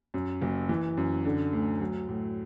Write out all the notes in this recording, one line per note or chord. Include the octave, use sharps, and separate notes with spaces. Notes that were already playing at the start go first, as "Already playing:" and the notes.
F#2
F#1
E3
F#2
D3
D2
F#3
A2